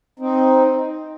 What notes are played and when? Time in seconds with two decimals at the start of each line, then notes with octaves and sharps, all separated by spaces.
0.19 C4 D#4